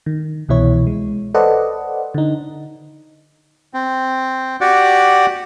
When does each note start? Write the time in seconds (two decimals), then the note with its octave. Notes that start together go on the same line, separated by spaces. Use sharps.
0.06 D#3
0.49 C2 B2 E3 E4 C#5
0.87 G#3
1.35 A4 B4 C5 D5 D#5 F#5
2.15 D3 D#4
3.74 C4
4.61 F#4 G4 D5 F#5